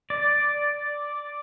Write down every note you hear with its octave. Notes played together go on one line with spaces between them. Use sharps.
D5